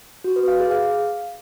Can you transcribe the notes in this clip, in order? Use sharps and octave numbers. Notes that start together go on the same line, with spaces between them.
F#4
B4
F5
G#4
F5